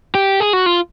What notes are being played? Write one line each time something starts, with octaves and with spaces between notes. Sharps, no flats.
G4
G#4
F#4
F4